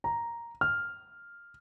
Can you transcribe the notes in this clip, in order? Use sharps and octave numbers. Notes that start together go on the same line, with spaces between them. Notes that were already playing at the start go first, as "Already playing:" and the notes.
A#5
F6